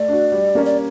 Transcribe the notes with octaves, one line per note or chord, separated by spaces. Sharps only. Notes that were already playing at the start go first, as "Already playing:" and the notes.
Already playing: A3 D5
D4 F#4
G3
A#3 C#4
D5